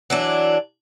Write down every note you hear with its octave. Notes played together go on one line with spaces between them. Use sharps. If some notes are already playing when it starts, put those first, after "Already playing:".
E3 F#3 D4